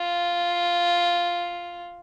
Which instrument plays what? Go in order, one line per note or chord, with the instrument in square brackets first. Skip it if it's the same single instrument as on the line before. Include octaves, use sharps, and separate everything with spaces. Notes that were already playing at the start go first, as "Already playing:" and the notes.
Already playing: [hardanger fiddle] F4